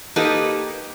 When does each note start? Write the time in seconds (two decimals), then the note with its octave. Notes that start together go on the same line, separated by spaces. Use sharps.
0.16 A#3 D#4 G4 A4 B4 D#5